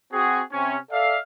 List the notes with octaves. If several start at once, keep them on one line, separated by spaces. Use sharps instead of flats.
C4 F#4 G#4
C3 C#4
A4 D5 E5 F5